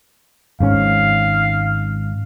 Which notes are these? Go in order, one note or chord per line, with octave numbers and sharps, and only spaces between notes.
G#1 G#2 C#4 F5